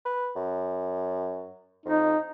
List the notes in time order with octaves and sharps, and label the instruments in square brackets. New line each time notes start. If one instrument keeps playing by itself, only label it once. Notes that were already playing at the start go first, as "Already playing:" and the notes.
[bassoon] B4
F#2
[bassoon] F2 [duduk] D#4